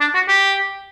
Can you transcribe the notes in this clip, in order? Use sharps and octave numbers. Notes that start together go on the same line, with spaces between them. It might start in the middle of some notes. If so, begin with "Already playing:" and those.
D4
F#4
G4